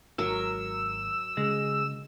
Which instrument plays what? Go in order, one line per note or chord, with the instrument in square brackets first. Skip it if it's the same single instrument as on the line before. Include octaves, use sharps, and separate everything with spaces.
[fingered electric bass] G#1 [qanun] F#3 A#4 [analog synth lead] E6
[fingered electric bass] C#3 [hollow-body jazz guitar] G#3